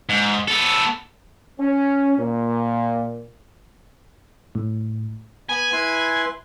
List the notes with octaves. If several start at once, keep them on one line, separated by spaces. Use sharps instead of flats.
G#2
B3 A4
C#4
A#2
A2
B3 G#5 B5
E4 B4 C6